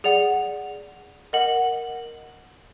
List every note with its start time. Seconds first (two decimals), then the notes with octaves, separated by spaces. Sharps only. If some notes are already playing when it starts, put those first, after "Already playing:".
0.04 G#4 D5 F#5 F7
1.33 A#4 D#5 F#5 F#7